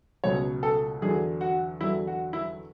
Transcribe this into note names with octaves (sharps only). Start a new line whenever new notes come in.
C#2 B2 F#3 C#5
A4
E2 D3 F#3 G#4
F#4
E2 D3 F#3 E4
F#4
E4